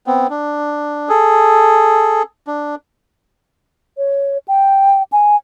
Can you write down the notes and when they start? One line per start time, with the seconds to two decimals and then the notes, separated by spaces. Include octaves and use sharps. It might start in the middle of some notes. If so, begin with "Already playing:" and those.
0.07 B3 C4
0.30 D4
1.09 G#4 A4
2.47 D4
3.98 C#5
4.48 G5
5.12 G#5